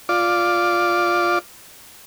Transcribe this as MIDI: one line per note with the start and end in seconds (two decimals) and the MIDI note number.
0.09 1.39 65
0.09 1.39 74